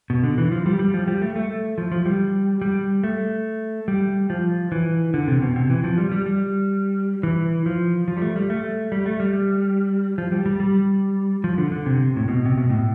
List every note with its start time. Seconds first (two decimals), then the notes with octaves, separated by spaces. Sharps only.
0.10 B2
0.24 D3
0.38 E3
0.52 F3
0.66 G3
0.79 G3
0.94 F3
1.08 G3
1.22 A3
1.36 A3
1.78 F3
1.92 F3
2.06 G3
2.61 G3
3.04 A3
3.88 G3
4.30 F3
4.72 E3
5.14 D3
5.28 C3
5.42 B2
5.56 C3
5.70 E3
5.84 F3
5.98 G3
6.11 G3
6.26 G3
7.23 E3
7.66 F3
8.08 F3
8.17 G3
8.22 A3
8.36 G3
8.50 A3
8.92 G3
9.06 A3
9.20 G3
10.18 F3
10.32 G3
10.46 G3
10.60 G3
11.44 F3
11.58 D3
11.72 D3
11.86 C3
12.16 A2
12.28 B2
12.45 C3
12.58 B2
12.70 A2